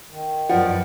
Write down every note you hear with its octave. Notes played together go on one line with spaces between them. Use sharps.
D#3
F#2 F3 B4 D5 F#5